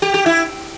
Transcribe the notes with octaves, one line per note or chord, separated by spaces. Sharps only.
G4
G4
E4